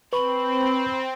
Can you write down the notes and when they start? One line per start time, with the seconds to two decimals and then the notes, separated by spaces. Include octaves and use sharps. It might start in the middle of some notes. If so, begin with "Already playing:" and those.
0.13 C4 B4 B5 C#6